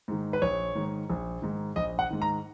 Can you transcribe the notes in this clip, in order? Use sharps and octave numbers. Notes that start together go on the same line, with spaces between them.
G#2 D#3
B4
A#1 C#5
G#2 D#3
A#1
G#2 D#3
A#1 D#5
F#5
G#2 D#3
A#5